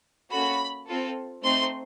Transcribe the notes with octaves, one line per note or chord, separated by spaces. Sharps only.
A#3 C#4 F#4 A4 B5
C4 F4 A4
A3 C4 D#4 C6